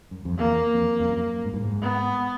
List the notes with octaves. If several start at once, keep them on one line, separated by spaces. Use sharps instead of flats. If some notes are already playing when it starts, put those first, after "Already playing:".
F#2
F2
E2 A#3
F2
F2
F#2
G#2
G2
G#2
B3